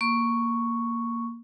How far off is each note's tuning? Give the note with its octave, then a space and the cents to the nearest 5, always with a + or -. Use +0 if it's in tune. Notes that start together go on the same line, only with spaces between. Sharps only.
A#3 +0 C#6 +0